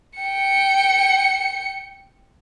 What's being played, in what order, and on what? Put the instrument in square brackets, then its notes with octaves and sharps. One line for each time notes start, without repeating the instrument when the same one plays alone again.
[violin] G5 C#7